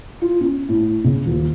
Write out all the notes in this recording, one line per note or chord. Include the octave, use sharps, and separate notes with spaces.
F4
C#4
A2
C#3
D#1